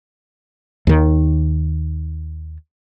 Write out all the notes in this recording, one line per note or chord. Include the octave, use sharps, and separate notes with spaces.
D#2 D#3